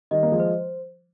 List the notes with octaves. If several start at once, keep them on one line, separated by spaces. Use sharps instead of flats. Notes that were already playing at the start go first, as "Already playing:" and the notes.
D#3 G3 D#5
A#3
F3 G#3
C5